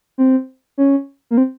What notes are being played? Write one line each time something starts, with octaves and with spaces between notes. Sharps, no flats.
C4
C#4
A#3
C4